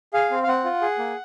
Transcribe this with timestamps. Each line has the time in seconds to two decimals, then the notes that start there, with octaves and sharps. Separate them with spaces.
0.13 G#4 F5
0.31 C4
0.43 F5
0.47 C4 F#5
0.64 F4
0.81 G#4
0.99 A#3